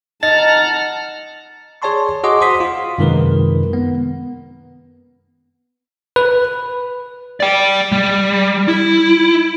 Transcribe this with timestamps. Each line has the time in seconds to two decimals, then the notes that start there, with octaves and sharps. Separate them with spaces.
0.23 D#4 F#5 A5 A#5 F6 A6
1.82 G#4 C#5 D5 A5 C6 C#6
2.24 F#4 G#4 D#5 F#5 C6 D6
2.41 C5 C6 D#6 B6
2.60 F4
2.98 F#2 C3 D#3 G#3 A#4 B4
3.73 B3
6.16 B4
7.40 D5 G5
7.92 G3
8.68 E4